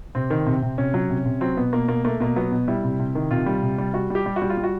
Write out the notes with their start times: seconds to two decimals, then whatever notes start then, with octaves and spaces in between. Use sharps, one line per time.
0.15 C3 C4
0.30 D#3
0.46 C3
0.62 C3
0.78 C3 C#4
0.94 F#3
1.10 C3
1.25 C3
1.41 F#3 C4
1.57 B2 B3
1.73 B2 A#3
1.88 B2 A#3
2.05 A3 A#3
2.20 B2 A#3
2.36 F#3 B3
2.51 B2
2.68 G3 E4
2.84 C3
2.99 C3
3.15 D#3
3.31 C3 F4
3.46 G3
3.63 C3
3.78 G3
3.94 G3 F#4
4.10 G3 G4
4.26 G3
4.36 F#4
4.42 G3
4.50 F4
4.57 G3
4.63 F#4